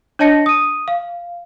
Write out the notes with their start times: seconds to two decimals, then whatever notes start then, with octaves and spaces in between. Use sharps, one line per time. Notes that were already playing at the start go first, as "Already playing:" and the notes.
0.19 D4 C#5 D#5 A5 A#6 C#7
0.46 D#6 D#7
0.88 F5